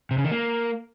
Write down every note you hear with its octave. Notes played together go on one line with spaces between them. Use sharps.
C3
C#3
D#3
A#3